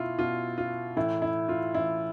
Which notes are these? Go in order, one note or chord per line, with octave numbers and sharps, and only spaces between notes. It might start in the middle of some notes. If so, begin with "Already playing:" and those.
Already playing: B2 E4 F4
B2 F4
F4
A2 E3 E4
E4
F4
A2 E3 E4